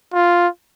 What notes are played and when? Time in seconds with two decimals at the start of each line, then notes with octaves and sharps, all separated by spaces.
0.14 F4